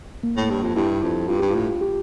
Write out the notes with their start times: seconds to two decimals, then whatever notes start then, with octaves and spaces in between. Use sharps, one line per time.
0.23 A#3
0.37 A2
0.50 G2
0.63 F2
0.75 G2 E4
1.02 F2
1.28 G2 F4
1.40 G2 G4
1.50 A2 F4
1.81 G4